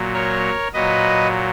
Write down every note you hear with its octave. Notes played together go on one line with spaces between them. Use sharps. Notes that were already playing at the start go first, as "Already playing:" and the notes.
Already playing: A#2 F#3
A#4 C#5
A#2 F#3 B4 D#5